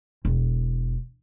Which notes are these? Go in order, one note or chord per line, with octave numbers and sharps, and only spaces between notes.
E1